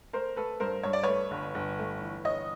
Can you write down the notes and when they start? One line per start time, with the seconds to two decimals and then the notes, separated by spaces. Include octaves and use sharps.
0.13 A3 A#4 C5
0.36 A3 A4 B4
0.60 G2 A#4 C5
0.83 G2 C#5
0.93 D5
1.03 A3 B4 C#5
1.31 G1
1.55 G1
1.78 A3
2.01 E3
2.25 G1 C#5 D#5